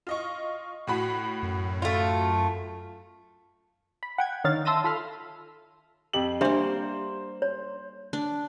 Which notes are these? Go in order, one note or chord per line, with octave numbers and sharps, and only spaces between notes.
F4 D#5 C#6
A2 F#4 B5
F#2
A3 F4
B5
F#5 G5 G#6
D3 D#3 D#4 C#5 F5 A6
E5 A5 C6 E6 A#6 D#7
F4 A4 B5 C6 F6
F2 G4 F#7
G3 A#3 D4 G4 C5 E5
C#5
D4